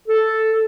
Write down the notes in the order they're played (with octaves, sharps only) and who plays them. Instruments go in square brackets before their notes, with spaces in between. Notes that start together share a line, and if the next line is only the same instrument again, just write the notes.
[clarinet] A4